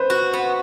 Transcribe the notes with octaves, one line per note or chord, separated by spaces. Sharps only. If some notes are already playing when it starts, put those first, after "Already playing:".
Already playing: B4 C5
F#4
B3